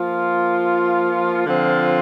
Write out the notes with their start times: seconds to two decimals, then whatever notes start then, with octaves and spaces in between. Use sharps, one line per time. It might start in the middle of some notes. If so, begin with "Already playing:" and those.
Already playing: F3 A#3 F4
1.47 D3 F3 C4 F4